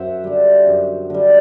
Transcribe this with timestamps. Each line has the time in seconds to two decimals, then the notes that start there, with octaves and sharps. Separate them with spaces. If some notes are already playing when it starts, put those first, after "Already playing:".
Already playing: F#2 C5 E5 F#5
0.24 D3 G3
0.67 F#2
1.10 D3 G3